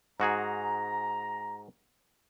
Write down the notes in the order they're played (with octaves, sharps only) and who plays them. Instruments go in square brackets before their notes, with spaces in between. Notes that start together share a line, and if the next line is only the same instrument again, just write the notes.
[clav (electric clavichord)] G#2 F#4 G#4 [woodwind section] A#5